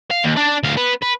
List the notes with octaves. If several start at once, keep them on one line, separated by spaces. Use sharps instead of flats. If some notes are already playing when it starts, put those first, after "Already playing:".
F5
D#2
D4 D5
D2 F5
B3 B4
B4